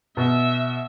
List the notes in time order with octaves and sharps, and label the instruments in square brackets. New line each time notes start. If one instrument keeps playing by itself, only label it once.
[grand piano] B2 [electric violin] E5